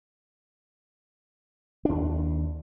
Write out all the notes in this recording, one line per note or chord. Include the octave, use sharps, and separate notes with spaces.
D#2 D4